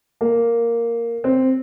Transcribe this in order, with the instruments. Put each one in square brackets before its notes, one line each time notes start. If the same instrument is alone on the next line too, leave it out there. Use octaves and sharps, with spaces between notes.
[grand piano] A#3
C4